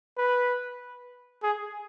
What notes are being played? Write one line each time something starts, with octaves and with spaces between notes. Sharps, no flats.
B4
G#4